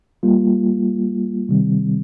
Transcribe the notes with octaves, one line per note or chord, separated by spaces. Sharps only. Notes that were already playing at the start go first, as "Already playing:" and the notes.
G3 A#3 F4
C3 D#3 G3 C4